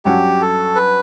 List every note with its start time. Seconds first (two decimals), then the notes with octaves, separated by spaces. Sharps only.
0.05 G2 F#3 C#4 F#4 G4
0.41 A4
0.75 B4